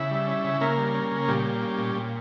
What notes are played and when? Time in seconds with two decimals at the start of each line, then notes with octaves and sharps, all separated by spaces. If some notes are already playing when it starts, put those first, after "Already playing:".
Already playing: C#3 E4 E5
0.11 G3
0.27 C#4
0.44 C#3
0.61 C#3 A#3 A#4
0.78 G3
0.94 C#4
1.11 C#3
1.28 A#2 G3 G4
1.45 A#3
1.62 C#4
1.78 A#2
1.96 A#2